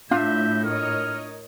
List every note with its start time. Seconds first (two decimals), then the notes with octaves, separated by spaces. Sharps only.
0.11 A2 D4 F4 E5 F5 G6
0.65 A#4 C#5 D#5 F6